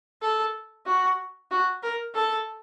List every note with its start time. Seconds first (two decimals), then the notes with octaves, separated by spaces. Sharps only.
0.22 A4
0.86 F#4
1.51 F#4
1.83 A#4
2.15 A4